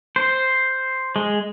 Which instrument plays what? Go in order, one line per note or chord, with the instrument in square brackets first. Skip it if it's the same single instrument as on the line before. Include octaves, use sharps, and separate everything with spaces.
[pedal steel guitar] C5
G#3